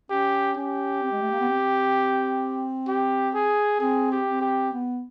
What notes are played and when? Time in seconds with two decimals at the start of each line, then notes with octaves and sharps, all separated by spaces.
0.10 C#4 G4
0.56 C#4 G4
1.03 C4
1.12 G#3
1.22 A3
1.31 A#3
1.40 B3
1.49 C4
2.88 G4
3.34 G#4
3.80 C4 G#4
4.12 G4
4.27 C4
4.41 G4
4.73 B3